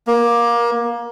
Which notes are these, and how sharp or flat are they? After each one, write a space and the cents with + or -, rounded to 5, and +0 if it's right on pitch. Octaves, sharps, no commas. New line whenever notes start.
A#3 +20